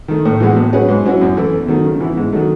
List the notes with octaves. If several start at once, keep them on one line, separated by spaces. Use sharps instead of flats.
D#3 A3
A2
E3 G#3 B3 F#4
A2
F#3 C#4 G#4 B4
G#2
F#3 C#4 E4
F#2
E3 A3 E4
E2
D#3 F#3 A3
C#3
E3 B3 E4
G#2
D#3 F#3 A3